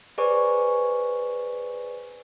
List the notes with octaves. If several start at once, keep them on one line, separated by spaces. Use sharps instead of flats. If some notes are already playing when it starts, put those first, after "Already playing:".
G#4 B4 C5 D5 G#5 C#6